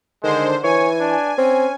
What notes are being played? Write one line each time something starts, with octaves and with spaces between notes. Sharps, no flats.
D3 D#3 G#3 C5
E3 C#5 G#5
D4
C4 C#4